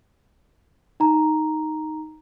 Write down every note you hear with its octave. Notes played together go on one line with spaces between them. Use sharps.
D#4 A#5